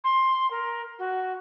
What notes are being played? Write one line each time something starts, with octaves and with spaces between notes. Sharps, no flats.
C6
A#4
F#4